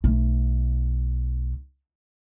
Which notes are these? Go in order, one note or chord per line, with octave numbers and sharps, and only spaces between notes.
B1 A3